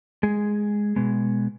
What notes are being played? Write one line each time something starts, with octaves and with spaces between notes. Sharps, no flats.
G#3 G#4
B2 G#3 B3